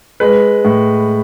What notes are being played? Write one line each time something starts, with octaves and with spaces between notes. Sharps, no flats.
G#3 B4
A2